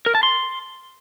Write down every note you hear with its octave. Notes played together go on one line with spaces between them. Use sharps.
A#4
A5
C6